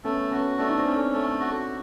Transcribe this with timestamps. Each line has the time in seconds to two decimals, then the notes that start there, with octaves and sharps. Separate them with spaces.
0.04 A3 B3 C#4
0.31 B3 C#4 F#4
0.58 A3 D4
0.69 D#4
0.79 C4 D4
0.86 C#4
1.13 A3
1.40 F#4